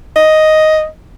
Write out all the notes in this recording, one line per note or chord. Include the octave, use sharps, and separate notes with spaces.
D#5